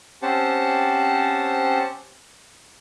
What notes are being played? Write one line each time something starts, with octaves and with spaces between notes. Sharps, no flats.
C4 C#4 G4 C5 F#5 A5